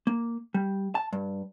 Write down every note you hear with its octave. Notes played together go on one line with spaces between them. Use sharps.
A#3
G3
A5
G2